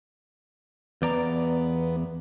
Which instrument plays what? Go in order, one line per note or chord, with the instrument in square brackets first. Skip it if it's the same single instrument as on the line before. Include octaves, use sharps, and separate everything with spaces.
[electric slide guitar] E2 D5 A#5 [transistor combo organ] B3